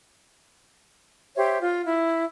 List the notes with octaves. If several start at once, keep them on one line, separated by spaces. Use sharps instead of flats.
G4 C5 C#5 E5
F4
E4